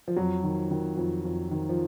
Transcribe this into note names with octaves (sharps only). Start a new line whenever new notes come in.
F3
F2 F#3
D#3
D#3
F2
F2
D#3
F3